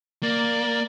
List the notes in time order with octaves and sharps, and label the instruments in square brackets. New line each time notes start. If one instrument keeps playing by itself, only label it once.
[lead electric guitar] A#3 [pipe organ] D5